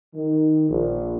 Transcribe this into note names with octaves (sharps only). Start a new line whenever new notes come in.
D#3
A#1